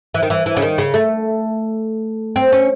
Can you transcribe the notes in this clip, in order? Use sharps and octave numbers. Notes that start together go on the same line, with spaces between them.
E3
D#3
E3
E3
C#3
D#3
C#3
A3
C4
C#4